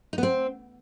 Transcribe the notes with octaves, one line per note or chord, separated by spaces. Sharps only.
D#4
B3
C4